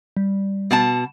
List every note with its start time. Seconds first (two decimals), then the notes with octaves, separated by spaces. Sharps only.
0.17 G3
0.71 B2 F#5 A5